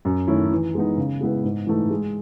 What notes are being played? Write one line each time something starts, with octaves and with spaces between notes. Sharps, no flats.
F#2
D#3 A3 C#4 E4
E3
G#3 B3 D#4
C#3
G#3 B3 E4 B4
G#2
E3 A3 D#4
G#3